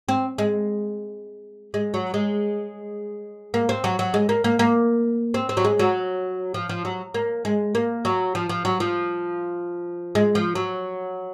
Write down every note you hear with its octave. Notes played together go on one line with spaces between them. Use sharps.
C4
G#3
G#3
F#3
G#3
A#3
C4
F#3
F#3
G#3
A#3
A#3
A#3
C4
C4
F#3
G#3
F#3
F3
F3
F#3
A#3
G#3
A#3
F#3
F3
F3
F#3
F3
G#3
F3
F#3